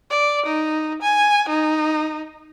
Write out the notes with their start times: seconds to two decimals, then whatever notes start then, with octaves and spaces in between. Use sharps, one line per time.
0.10 D5
0.46 D#4
1.02 G#5
1.49 D#4